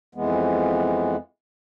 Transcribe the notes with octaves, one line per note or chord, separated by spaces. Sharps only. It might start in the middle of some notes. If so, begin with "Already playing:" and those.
F2 E3 G#3 B3